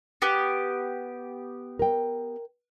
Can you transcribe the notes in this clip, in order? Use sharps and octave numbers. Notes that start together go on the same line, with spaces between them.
B3 G4
A#4 G5